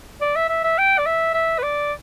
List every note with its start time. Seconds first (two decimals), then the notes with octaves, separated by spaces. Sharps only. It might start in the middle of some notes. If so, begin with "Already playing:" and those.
0.21 D5
0.36 E5
0.49 E5
0.64 E5
0.78 G5
0.98 D5
1.06 E5
1.34 E5
1.58 B4
1.63 D5